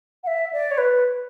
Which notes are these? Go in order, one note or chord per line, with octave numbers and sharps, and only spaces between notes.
F#5
E5
D5
C#5
B4